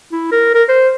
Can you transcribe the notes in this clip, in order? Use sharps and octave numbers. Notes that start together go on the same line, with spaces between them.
E4
A#4
A#4
C5